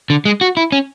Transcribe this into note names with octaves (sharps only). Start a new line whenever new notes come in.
D3
G#3
F#4
E4
C#4